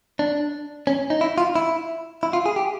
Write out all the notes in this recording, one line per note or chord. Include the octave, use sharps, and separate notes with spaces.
D4
C#4
D#4
E4
F4
E4
E4
F4
G#4
G4